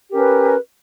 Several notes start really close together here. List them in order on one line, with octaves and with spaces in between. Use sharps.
G4 A#4 C#4 B4